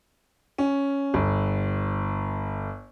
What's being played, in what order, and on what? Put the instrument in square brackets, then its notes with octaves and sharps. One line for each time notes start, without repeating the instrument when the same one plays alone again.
[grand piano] C#4
G1